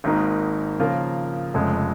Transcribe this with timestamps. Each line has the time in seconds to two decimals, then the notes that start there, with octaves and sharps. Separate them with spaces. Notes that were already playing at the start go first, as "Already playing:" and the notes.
0.04 G#1 G#2 D#3 A#3 D#4
0.80 C#3 F3 A#3 F4 A#4
1.54 F1 F2 C#3 G#3